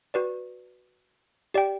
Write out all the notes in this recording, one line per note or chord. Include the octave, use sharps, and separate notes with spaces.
F#4 B4 D5
G4 D5 G5